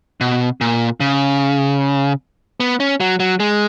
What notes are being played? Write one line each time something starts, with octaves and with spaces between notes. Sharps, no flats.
B2
A#2
C#3
B3
C#4
F#3
F#3
G#3